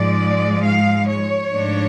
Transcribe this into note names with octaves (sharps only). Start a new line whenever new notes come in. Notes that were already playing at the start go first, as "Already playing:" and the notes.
Already playing: G#2 F3 G#3 D5
F5
C#5
G#2 F3 A3 D4